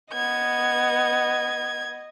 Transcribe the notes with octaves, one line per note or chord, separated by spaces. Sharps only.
B3 D#5 G#6